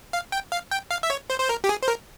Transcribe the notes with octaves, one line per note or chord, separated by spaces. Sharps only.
F5
G5
F5
G5
F5
E5
C#5
C5
C5
A#4
G4
G#4
C5
A#4